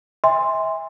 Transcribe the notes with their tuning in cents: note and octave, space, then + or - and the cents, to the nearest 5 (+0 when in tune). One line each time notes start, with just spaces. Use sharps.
E5 -30 G#5 -35 C6 +0